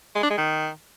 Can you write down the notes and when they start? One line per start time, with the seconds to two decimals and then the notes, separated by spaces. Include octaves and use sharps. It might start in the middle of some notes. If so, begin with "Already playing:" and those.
0.15 G#3
0.23 D4
0.30 G#3
0.38 D#3